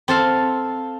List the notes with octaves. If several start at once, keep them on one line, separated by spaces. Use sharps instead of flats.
C4 A4 F5